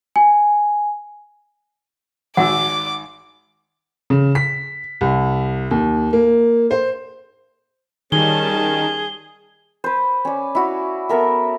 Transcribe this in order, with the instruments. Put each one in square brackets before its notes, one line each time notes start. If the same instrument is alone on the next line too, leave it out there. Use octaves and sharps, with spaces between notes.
[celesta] G#5
[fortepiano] G#1 F#4 E6 [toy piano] F#5 [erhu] D6
[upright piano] C#3
B6
C2
D#2
A#3
C5
[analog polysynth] D#3 [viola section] G3 C#4 A5 [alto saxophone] G#4 [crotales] G7
[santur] B4 C5
C#4 D5
E4 F#4 F5
B3 A4 A#4 E5